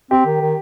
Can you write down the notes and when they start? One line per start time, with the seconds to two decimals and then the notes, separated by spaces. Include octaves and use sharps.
0.11 C4 G4
0.26 D#3
0.41 D#3